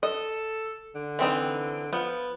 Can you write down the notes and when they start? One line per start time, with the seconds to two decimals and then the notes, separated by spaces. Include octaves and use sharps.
0.03 A4 D#5
0.95 D3
1.19 E3 C4 D#4
1.93 F3 B3